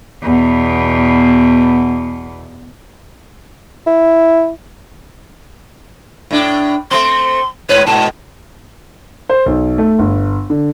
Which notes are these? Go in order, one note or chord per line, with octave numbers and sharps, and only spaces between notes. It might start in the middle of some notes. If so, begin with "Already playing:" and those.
E2 B2
E4
A2 D4
A3 C4 C6
G#2 B4 C#5
G#2 B2 A5
C5
B1
A3
G1
D3